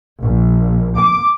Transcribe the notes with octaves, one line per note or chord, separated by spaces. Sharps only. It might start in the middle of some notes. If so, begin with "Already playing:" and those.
A#1
D6